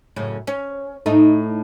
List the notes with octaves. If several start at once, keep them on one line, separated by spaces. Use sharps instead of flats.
F#2 A2 C#3
C#4
A2 A3 D#4